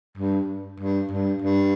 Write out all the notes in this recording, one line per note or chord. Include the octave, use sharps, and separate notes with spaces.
G2
G2
G2
G2